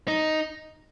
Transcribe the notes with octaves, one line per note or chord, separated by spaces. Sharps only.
D#4